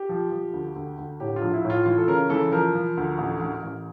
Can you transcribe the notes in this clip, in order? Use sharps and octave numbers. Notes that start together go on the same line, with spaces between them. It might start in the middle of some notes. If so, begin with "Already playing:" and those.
Already playing: G4
F3
F3
D2
D2
D2
A2 G4
F4
A#1
E4
A2
F4
E3 F4
A4
C#3 A#4
E3 A4
F3 A#4
F3
D2
A1
A1
A1